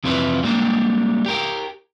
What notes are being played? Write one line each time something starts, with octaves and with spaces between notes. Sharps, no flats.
F2 C3 E3 E4 F4 B4
G3 G#3 A#3 D4 G4
G4 A#4 G5